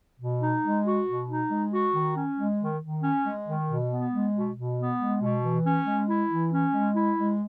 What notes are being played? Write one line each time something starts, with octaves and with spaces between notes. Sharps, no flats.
B2
D#4
G#3
F#4
B2
D#4
G#3
F#4
D#3
C#4
G#3
D#3
D#3
C#4
G#3
D#3
B2
B3
G#3
B2
B2
B3
G#3
B2
E3
C#4
G#3
E4
E3
C#4
G#3
E4
G#3